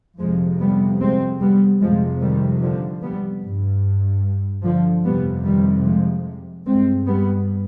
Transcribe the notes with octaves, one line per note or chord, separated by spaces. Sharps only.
F2 C3 F3 G#3
G3 B3
G#3 C4
G3 B3
F2 C3 F3 G#3
D#3 G3
D3 F3
G3 B3
G2
D3 F3
F2 C3 G3 B3
D#3 G3
F3 G#3
G2 G#3 C4
G3 B3